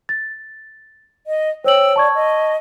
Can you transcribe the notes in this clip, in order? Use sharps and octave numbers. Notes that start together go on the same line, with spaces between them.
A6
D#5
C5 C#5 G5 E6 F#7
D5 A5 C#6 G#6
D#5